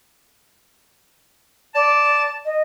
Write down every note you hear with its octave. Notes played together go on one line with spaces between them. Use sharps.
D5 A5
D#5